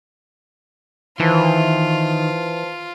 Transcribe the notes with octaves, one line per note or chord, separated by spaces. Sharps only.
D#3 E3 F4 B4 C5 A5